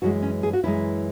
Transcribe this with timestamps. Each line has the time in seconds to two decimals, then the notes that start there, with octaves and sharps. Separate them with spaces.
0.02 F#2 E3 G#3 F#4
0.22 C#4
0.43 G#4
0.53 F#4
0.64 F#2 E3 G#3 E4